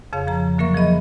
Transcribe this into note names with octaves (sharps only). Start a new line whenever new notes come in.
F2 C#3 G#4 C#5 F5
F3 A#5
D3 F#3 A#3 A#4 E5 C#6
F3 G#4 D#5 B5